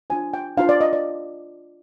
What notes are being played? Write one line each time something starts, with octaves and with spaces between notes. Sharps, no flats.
D4 F4 C5 G#5
G5
D4 F4 C5 F5
D5
D#5
D5